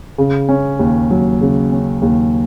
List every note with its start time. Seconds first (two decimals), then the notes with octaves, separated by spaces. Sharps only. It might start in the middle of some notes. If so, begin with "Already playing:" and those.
0.18 C#3
0.49 C#4
0.79 D#2
1.10 F#3
1.41 C#3
1.72 C#4
2.02 D#2